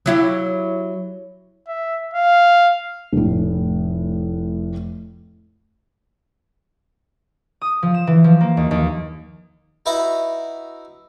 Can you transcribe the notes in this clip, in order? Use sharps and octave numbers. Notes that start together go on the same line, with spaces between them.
F#3 E4 G4
E5
F5
F1 A2
D#6
F3
E7
E3
F3
A#3
D#2
D#2
D#4 E4 F#4 B4 E5